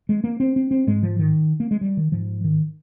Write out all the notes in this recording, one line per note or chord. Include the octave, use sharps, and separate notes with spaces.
G#3
A#3
C4
C4
C4
G#2 G#3
F3
D#3
A#3
G#3
G3
D#3
G#2 F3
D#3